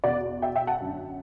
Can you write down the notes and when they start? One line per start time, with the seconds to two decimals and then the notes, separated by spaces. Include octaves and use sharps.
0.04 E2 B2 D5 F#5
0.42 E5 G5
0.56 E5 G5
0.67 F#5 A5
0.81 F#2 D3